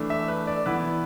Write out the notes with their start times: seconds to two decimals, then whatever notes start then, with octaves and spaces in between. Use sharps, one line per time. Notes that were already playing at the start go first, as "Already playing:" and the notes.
Already playing: E3 A3 D4
0.10 E5
0.28 B4
0.47 D5
0.66 E3 B3 E4 B4